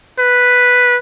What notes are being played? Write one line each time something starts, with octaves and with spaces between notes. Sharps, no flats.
B4